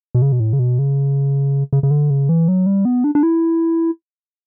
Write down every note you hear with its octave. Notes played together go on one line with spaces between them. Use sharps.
B2
C#3
B2
A2
C#3
B2
C#3
C#3
C#3
D3
C#3
E3
F#3
G3
B3
D4
D4
E4